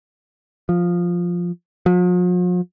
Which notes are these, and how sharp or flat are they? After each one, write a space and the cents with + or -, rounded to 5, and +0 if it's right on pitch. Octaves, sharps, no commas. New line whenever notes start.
F3 +5
F3 +45